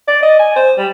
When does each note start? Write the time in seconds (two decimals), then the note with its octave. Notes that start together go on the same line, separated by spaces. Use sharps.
0.08 D5
0.23 D#5
0.40 G#5
0.56 C5
0.78 G3